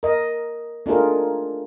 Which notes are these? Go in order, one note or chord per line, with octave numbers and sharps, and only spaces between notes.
A#4 D#5
A3 D4 D#4 F4 G#4 A#4